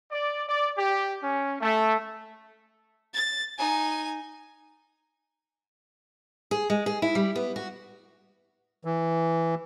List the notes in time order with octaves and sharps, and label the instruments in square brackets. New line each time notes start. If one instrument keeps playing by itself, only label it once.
[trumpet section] D5
D5
G4
C#4
A3
[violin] A6
D#4 G#5
[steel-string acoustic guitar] G#4
G#3
G#4
E4
G3
B3
F#4
[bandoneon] E3